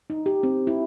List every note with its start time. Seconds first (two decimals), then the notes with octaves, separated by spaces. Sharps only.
0.10 D#4
0.26 G4
0.43 C4
0.67 E4